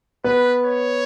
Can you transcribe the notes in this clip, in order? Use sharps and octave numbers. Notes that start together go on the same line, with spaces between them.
B3 B4
C#5